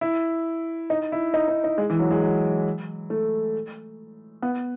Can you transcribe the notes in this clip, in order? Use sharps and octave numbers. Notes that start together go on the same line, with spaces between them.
E4
D#4
E4
D#4
D#4
D#4
G#3
E3
F#3
G#3
F#3
A3
B3